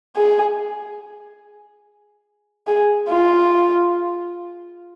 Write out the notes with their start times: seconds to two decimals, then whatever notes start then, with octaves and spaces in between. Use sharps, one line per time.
0.16 G#4
2.67 G#4
3.09 F4